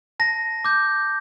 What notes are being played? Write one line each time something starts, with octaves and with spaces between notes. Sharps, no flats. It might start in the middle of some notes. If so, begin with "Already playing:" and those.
A5 A#6
D6 G6